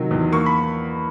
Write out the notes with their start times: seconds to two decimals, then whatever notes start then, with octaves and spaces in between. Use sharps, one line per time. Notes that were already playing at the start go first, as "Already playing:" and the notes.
Already playing: C3 D#3 F#3
0.11 E2
0.32 A#3 C#6
0.46 B5